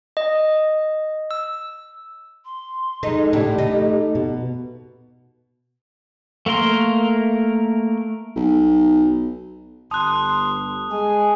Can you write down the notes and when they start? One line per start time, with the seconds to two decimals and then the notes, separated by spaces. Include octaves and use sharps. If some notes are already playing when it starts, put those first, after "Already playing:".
0.17 D#5
1.31 E6
2.45 C6
3.03 G#3 D#4 A4
3.33 A2 C#3 D4 G4
3.58 A3 D#4
4.15 B2
6.46 A3 A#3 A#4 C6
8.36 B1
9.91 G1 A5 C6 D#6 F#6
10.90 G#3 G#5